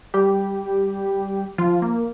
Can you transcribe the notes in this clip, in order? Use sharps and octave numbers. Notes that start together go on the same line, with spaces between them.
G3 G4
F3 F4
A#3